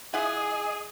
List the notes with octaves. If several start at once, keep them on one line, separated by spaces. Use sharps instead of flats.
E4 F4 G#4 D#5 F#5 G#5 D#6